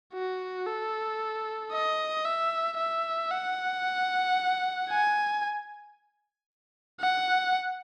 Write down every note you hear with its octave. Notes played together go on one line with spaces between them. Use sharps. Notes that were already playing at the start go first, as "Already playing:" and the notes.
F#4
A4
D#5
E5
E5
F#5
G#5
F#5